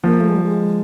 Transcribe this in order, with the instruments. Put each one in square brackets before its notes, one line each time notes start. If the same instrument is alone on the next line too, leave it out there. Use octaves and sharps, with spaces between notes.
[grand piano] F3 [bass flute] A#3
[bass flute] A3
G#3
G3
G#3